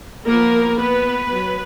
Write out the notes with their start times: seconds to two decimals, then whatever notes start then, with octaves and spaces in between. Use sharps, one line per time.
0.26 F3 A#3 B3 A#4
0.78 B3 B4
1.30 F#3 B3